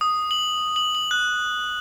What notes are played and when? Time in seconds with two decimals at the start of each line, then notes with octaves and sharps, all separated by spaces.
0.01 D#6
0.31 F#7
0.76 F#7
0.95 F#7
1.11 F#6